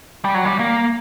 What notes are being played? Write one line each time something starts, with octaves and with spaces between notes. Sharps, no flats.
G3
F#3
G3
A#3